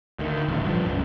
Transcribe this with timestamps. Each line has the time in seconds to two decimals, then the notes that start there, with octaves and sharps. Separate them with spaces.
0.19 D2 D#3
0.48 D#1 A1 D2
0.65 G2 F3
0.86 C#2 F#2